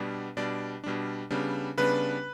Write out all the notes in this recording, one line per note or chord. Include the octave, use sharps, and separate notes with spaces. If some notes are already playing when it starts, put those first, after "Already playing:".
Already playing: B2 G3 B3 D4
B2 G3 D4 D5
B2 G3 D4
C#3 G3 B3 D4
C#3 G3 B3 D4 B4